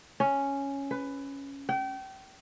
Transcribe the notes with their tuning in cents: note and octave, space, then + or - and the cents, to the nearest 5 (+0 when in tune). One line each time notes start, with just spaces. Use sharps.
C#4 +0
B4 +15
G5 -30